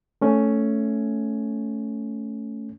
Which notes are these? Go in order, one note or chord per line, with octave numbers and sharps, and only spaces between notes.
A3 C#4